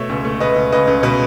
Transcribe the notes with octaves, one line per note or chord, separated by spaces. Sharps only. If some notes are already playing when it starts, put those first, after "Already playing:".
Already playing: B2 A3 C#5 E5
C#2
A3
C#2 B4 D#5
C#2
C#2 B4 D#5
C#2
B2 B4